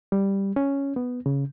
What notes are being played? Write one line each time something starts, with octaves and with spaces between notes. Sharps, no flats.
G3
C#4
B3
C#3